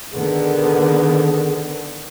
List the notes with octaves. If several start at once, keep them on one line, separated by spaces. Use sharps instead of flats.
D3 D#3 B3 G#4